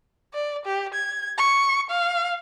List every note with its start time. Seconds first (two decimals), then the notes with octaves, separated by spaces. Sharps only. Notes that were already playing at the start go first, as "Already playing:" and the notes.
0.34 D5
0.65 G4
0.94 G#6
1.38 C#6
1.90 F5